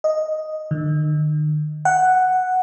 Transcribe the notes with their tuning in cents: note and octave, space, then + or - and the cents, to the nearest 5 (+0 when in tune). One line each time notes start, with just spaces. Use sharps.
D#5 +0
D#3 -45
F#5 +0